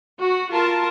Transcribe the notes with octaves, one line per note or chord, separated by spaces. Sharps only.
F#4
F4 A#4 A5